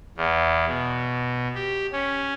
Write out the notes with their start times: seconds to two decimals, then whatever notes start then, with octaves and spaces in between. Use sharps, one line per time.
0.17 E2
0.67 B2
1.55 G4
1.92 C#4